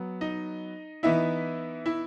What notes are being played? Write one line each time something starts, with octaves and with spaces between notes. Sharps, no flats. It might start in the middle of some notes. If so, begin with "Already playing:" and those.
Already playing: F#3 B3
D#4 D#5
E3 B3 D#4 E4 E5
E4 E5